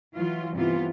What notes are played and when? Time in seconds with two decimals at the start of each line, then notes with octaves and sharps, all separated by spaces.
0.15 E3 F#3 F4
0.54 G2 C3 E3 B3 F4